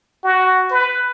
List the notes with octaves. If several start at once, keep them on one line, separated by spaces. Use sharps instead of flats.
F#4
B4